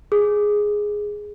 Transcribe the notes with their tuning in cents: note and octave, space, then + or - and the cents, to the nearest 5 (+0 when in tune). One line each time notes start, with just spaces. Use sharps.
G#4 +0